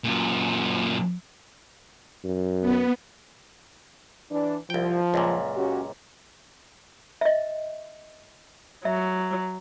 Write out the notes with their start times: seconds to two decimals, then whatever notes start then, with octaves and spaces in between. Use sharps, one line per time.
0.04 F#2 A#2
2.24 F#2
2.61 B3
4.30 E3 D4
4.70 C2 F3 G5
5.14 C#2 F#2 A#2
5.56 C#4 F#4 G4
7.21 D#5 E5
8.85 F#3 E5